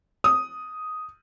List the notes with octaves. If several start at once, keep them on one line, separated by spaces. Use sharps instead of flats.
D#6